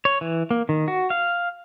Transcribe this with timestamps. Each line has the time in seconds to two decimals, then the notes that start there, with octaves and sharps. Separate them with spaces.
0.05 C#5
0.21 E3
0.51 A#3
0.69 D#3
0.88 F#4
1.10 F5